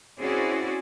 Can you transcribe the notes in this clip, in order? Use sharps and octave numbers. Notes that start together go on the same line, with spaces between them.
C4 C#4 E4 F#4 G#4 D5